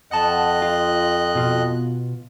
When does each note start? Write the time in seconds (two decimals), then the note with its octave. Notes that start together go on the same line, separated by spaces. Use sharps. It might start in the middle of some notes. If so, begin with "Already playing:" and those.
0.11 F2 D#5 F#5 A5 F#6
0.62 F4
1.35 B2 F4